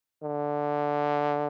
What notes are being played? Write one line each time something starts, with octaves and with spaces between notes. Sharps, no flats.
D3